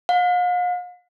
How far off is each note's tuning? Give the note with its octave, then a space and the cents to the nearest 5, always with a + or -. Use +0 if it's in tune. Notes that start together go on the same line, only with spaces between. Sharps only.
F5 +45